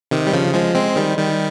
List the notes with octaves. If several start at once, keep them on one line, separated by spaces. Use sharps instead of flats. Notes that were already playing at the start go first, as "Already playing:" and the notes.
C3 D#3
G3
C#3 F3
F3 G#3
G#3 C4
D#3 G3
D#3 G3